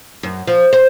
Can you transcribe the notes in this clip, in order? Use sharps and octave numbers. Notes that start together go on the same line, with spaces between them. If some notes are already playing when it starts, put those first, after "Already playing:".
F#2
F3
C5